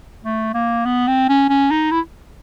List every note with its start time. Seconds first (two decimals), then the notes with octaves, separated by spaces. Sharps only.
0.24 A3
0.54 A#3
0.86 B3
1.08 C4
1.29 C#4
1.49 C#4
1.71 D#4
1.91 E4